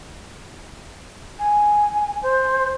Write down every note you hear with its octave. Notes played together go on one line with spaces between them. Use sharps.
G#5
C5